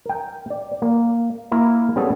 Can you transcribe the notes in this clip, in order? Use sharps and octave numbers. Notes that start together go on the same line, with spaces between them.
A#4 G5
D5
A#3
A#3 E4 A#4
G3 B3 C#4 G#4 A4